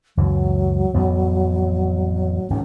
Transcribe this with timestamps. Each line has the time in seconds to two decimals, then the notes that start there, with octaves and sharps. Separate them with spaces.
0.17 C#2 F#2 E3 F#3
0.94 A1 F2 B3
2.50 G#1 C3 C#4